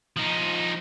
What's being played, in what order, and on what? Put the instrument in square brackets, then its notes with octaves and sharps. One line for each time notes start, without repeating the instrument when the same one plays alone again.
[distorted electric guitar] F3 D#4